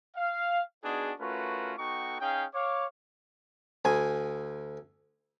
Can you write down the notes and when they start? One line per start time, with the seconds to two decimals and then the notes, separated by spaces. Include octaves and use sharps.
0.16 F5
0.84 B3 D4 D#4 F#4 G#4
1.20 A3 C#4 F4 F#4 A#4 B4
1.78 B3 D#4 F#4 A4 G5 C#6
2.20 C#4 D#4 G#4 F5 G5
2.54 C#5 F5 D6
3.85 D2 G#5